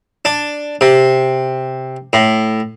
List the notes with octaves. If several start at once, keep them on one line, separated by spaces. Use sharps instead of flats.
D4
C3
A2